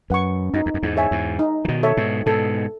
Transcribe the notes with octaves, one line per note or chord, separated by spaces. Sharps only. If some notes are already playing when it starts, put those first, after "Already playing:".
F#2 B4 F#5 C#6
F#2 D#4
E2
F#2
E2 G#2
G#4 C#5 E5 G#5
E2 G#2
D#4
E3
B2 D#3
A4 C#5 E5
G#2 B2
G#2 B2 A4